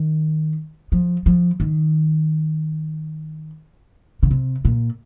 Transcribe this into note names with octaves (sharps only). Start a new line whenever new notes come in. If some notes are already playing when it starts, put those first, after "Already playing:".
Already playing: D#3
F3
F3
D#3
C#3
C3
A#2